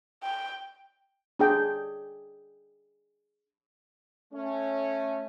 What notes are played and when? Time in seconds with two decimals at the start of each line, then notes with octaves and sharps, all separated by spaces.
0.24 G5
1.39 D4 G#4 G5
4.33 A3 C#4